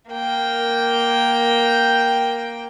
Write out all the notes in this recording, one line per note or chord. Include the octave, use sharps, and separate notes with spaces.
A#3 G5